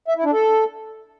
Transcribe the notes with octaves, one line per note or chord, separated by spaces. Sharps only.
E5
E4
D4
A4